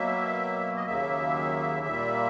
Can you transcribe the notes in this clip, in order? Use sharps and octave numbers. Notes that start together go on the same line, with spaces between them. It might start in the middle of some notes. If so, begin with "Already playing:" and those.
Already playing: B2 F#3 A#3 E5
D#5
D#2 C#3 F#3 A#3 E5
A#2 G3 A#3